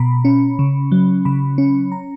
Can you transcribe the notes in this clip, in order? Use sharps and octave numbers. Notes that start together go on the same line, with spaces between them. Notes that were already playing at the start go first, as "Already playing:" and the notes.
Already playing: B2 A#5 B5
C#4
C#3
F#3
C#3 B5
C#4
A#5